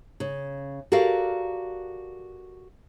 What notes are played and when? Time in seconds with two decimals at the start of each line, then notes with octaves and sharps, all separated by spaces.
0.20 C#3
0.92 F#4 G4 A4 A#4 D5 F5